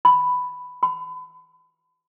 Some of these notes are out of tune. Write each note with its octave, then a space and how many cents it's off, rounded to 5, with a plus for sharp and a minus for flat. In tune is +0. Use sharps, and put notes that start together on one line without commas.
B5 +5
B5 +35